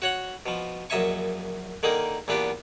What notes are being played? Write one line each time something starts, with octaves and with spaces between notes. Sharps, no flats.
F#4 C#5 F#5
B2 F3
A#1 F#2 D#5 E5 G#5 C#6
D3 D#3 A#3 D#4 G#4
E2 A#2 B3 D4 G4